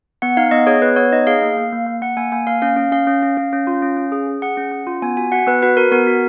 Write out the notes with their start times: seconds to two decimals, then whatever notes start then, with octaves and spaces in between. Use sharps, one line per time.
0.22 B3 F#5
0.37 D#4 F5
0.51 B3 D#5
0.67 G#4 C#5
0.82 B3 B4
0.96 B3 C#5
1.12 D#4 D#5
1.27 G#4 F5
1.42 A#3
1.57 A#3
1.72 A#3
1.87 A#3
2.02 A#3 F#5
2.17 A#3 G#5
2.32 A#3 G#5
2.47 A#3 F5
2.62 C#4 F5
2.77 C#4
2.92 C#4 F5
3.07 C#4
3.22 C#4
3.37 C#4
3.53 C#4
3.67 F4
3.82 C#4
3.97 C#4
4.12 G#4
4.27 G#4
4.42 G#4 F#5
4.57 C#4
4.72 C#4
4.87 F4
5.02 B3 G#5
5.17 F#4 G#5
5.32 F#4 F#5
5.47 B3 B4
5.62 F#4 B4
5.77 F#4 A#4
5.91 B3 A#4
6.07 F#4